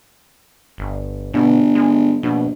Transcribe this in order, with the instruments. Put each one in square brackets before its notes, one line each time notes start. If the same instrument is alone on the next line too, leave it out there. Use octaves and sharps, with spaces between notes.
[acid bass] G1
[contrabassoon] G1 [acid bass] B2
[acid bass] G#3
[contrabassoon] A#1 [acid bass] B2